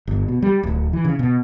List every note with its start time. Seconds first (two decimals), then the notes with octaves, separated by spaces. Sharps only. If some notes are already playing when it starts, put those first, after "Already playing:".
0.07 G1
0.28 B2
0.43 G3
0.63 D1
0.93 E3
1.05 C#3
1.19 B2